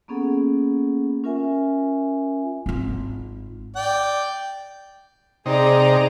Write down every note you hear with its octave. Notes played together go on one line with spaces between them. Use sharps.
A#3 B3 C#4 G#4 A4 F#5
C#4 F4 A#4 E5 G#5
G#1 F4
D5 G5
C3 D#4 G#4 D5 A#5